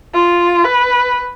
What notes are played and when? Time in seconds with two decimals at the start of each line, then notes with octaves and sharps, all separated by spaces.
0.14 F4
0.65 B4